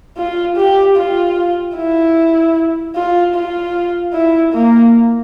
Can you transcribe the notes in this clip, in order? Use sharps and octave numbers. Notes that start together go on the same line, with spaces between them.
F4
G4
F4
E4
F4
F4
E4
A#3